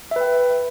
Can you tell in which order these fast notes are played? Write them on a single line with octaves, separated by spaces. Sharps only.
E5 B4 G5